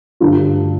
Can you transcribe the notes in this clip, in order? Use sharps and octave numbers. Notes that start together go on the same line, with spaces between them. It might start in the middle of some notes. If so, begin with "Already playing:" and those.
G2 D3 A3 F4